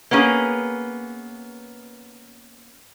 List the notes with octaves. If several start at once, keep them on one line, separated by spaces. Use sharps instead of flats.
A#3 B3 C#4 G#4